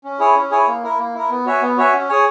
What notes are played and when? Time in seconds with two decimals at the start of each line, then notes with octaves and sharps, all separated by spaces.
0.04 C#4
0.19 E4 G#4 C#5 G#5
0.35 C#4
0.51 E4 G#4 C#5 G#5
0.67 A#3
0.83 E4 A#4
0.99 A#3
1.14 E4 A#4
1.30 B3
1.46 F#4 C#5 E5 G#5
1.62 B3
1.77 F#4 C#5 E5 G#5
1.93 C#4
2.09 G#4 C#5 G#5